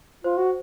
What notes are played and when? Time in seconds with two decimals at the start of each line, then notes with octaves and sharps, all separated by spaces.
0.24 F4 C5
0.38 F#4